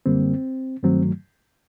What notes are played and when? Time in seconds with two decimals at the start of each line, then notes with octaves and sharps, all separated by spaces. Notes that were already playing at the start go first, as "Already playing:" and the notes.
0.06 F#2 D3 G3 A#3 C4
0.83 G2 D#3 F#3 A3 C4